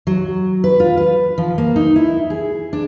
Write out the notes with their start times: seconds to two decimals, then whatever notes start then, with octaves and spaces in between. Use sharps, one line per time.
0.07 F#3
0.64 B4
0.80 F4
0.97 B4
1.38 F3
1.58 A#3
1.76 D#4
1.96 E4
2.30 G#4
2.73 D4